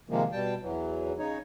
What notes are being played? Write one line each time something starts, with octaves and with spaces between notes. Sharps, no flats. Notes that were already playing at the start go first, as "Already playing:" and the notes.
C3 D#3 F3 G#3 A#3
B2 G3 G5 A5
E2 E3 F#3
C#3 D#4 C#5